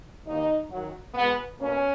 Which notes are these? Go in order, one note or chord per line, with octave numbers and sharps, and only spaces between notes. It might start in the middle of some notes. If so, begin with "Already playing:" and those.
D#2 D#3 A#3 D#4
F#2 D#3 F#3
B2 G#3 B3
B2 A#3 C#4